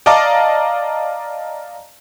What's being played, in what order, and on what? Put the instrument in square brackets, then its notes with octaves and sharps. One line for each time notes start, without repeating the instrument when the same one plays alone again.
[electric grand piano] D5 D#5 F5 A5 A#5 D6